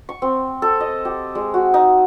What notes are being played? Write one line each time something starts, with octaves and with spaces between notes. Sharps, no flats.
C#6
C4
A4
D#5
G4
G#3
F#4
D#4